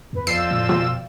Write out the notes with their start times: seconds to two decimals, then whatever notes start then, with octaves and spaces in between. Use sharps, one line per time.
0.13 E2 B4
0.27 F2 D5 F5 G5 E6 C7
0.51 A2
0.69 B2 F3